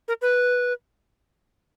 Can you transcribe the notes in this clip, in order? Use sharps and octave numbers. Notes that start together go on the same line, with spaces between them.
A#4
B4